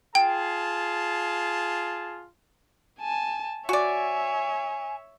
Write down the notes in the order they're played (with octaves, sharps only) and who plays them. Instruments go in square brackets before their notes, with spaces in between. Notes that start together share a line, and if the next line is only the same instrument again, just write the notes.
[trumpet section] F4 G#4 A5 [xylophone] G5
[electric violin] G#5 A5
[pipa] F#4 D5 [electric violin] C#5 E5 [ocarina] G#5